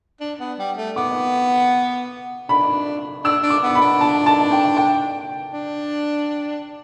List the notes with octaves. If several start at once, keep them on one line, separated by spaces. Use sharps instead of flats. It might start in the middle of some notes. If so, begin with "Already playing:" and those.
D4
B3
G3
A3
B3 D6
D4 B5
D4 E6
D4
D6
B3
B5
D4
A5
A5
G5
G5
D4